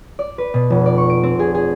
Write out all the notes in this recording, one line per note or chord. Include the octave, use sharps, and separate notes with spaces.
D5
B4
B2
F1
D5
C#6
D7
C4
G#4
G#4